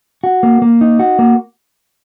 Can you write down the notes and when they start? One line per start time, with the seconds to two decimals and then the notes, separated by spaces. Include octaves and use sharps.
0.24 F#4
0.43 A#3
0.62 A#3
0.81 D#4
0.99 F#4
1.19 A#3